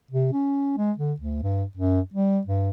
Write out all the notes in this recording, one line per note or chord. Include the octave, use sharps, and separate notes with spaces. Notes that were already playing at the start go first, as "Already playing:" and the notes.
C3
C#4
G#3
D3
D2
G2
F#2
G3
G2